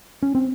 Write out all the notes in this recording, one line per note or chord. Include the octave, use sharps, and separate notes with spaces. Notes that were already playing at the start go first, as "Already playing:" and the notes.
C#4
C4